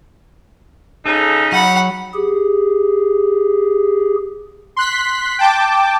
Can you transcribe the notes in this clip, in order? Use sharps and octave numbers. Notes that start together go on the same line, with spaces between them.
C#3 D#4 A4
F#3 F#5 B5
G4 G#4
C6 F#6 B6
G5 A5 D6